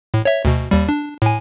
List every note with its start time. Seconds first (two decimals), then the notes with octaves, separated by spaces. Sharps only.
0.14 A2
0.25 C#5 E5
0.45 D2 B2
0.71 D#2 G3
0.89 D4
1.22 A2 G#5